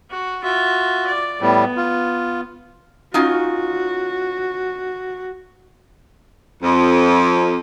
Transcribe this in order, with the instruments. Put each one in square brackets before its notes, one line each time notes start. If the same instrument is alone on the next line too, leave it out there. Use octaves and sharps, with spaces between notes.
[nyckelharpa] F#4
[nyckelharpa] F4 E5 [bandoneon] F#4
[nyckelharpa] D5
[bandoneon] A2 G3 [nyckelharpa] B3
[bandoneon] F4
[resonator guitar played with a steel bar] C#4 D#4 F4 [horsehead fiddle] F#4
[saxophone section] F2